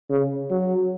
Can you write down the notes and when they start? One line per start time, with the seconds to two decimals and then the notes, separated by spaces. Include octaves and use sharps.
0.10 C#3
0.50 F#3